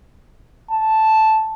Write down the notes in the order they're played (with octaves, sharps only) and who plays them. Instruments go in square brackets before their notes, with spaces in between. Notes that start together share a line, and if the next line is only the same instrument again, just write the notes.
[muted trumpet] A5